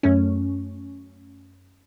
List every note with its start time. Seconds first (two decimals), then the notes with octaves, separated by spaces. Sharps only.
0.03 F#2 A3 C#4